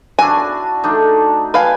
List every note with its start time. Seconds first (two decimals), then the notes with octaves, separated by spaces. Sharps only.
0.19 D4 E4 F#4 G#5
0.84 A3 D4 D#4
1.54 B4 F5 G5 G#5 B5